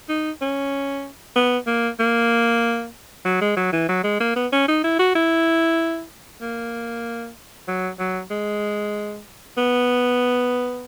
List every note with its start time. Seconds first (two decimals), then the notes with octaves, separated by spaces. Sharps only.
0.09 D#4
0.42 C#4
1.36 B3
1.67 A#3
2.00 A#3
3.25 F#3
3.41 G#3
3.57 F#3
3.73 E3
3.89 F#3
4.04 G#3
4.20 A#3
4.36 B3
4.53 C#4
4.68 D#4
4.84 E4
4.99 F#4
5.15 E4
6.42 A#3
7.68 F#3
7.99 F#3
8.31 G#3
9.57 B3